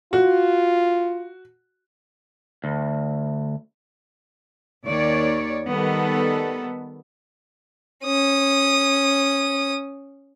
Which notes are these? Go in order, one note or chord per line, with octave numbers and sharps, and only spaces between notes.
F4 F#4
D2
D#2 D#3 C#5 D5
D#3 G3 B3 A4
C#4 D#6